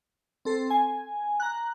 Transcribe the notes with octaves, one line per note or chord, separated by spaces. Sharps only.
C4 A4 C7
G#5
A#5 F#6